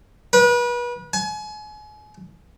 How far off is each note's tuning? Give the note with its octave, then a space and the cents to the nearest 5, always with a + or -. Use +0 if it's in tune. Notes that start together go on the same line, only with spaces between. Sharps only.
B4 -35
G#5 +35